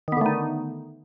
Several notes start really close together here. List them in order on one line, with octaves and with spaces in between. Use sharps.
D#3 B3 D3 A3 D#4